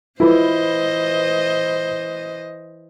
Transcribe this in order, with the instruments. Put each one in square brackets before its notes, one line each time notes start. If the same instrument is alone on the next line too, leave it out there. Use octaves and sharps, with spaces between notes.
[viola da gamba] E3 C5 D#5 [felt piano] E4 F4 B4